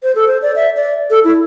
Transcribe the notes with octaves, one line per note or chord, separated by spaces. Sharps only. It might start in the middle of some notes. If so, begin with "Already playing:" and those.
C5
A4
C5
D5
E5
D5
A4
E4